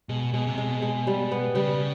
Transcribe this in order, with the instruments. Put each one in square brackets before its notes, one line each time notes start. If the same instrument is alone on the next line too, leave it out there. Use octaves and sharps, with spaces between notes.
[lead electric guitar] B2 [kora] G#3
[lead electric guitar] B2 [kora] G#3
[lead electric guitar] C3
[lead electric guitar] B2 [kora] G#3
[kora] G#3
G3
B3
[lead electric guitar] C#3 [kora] G3